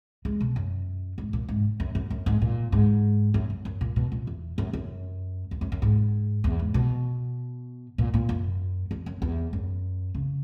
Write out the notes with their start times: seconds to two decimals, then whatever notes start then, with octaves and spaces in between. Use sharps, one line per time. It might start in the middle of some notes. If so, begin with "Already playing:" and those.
0.25 G#3
0.41 B2
0.56 F#2
1.18 G#2
1.33 A#2
1.49 G#2
1.80 F#2
1.95 F#2
2.11 F#2
2.26 G#2
2.42 A#2
2.72 G#2
3.34 F#2
3.50 F#2
3.65 F#2
3.81 A#2
3.96 B2
4.12 A#2
4.27 E2
4.58 F#2
4.73 F#2
5.51 E2
5.61 F#2
5.72 F#2
5.82 G#2
6.44 E2
6.59 G#2
6.74 B2
7.98 A#2
8.14 A#2
8.29 F#2
8.91 E2
9.06 F#2
9.22 E2
9.53 F#2
10.15 C#3